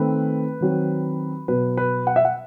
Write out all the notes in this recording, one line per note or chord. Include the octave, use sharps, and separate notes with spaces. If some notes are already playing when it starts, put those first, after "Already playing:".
Already playing: D#3 A3 C4 B4
D#3 F#3 C4
B2 F#3 B3 B4
B4
F#5
E5
F#5